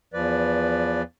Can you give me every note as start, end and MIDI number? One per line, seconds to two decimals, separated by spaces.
0.14 1.02 40
0.14 1.02 53
0.14 1.02 71
0.14 1.02 74